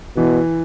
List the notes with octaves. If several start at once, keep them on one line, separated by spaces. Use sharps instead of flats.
B2 E3